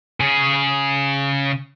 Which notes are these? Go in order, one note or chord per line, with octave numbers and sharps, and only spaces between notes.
C#3 G#4